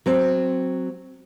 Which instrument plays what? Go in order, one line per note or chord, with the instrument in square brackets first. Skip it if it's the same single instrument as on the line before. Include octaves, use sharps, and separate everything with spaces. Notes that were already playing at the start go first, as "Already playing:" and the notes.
[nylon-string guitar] F#3 C4